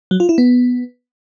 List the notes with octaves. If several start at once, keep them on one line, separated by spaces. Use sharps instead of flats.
F#3
F4
E4
B3